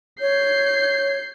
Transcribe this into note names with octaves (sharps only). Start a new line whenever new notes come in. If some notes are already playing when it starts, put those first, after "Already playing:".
C#5 G6 C7